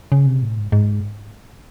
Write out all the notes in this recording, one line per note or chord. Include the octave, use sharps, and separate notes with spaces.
C#3
C3
A2
G#2
G#2